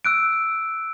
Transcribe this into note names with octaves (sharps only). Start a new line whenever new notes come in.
E6 F#6 D7